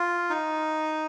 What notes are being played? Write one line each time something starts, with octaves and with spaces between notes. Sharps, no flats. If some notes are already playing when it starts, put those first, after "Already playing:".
Already playing: F4
D#4